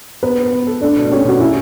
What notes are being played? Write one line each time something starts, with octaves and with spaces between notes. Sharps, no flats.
B3 B4
B3
B3
A4
A3 D4
B2
C#4 G4
B2 F#4
C#4 E4